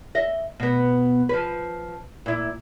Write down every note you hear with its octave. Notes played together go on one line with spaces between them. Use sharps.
D#5 E5
B2 B3
F3 B4
A#2 E4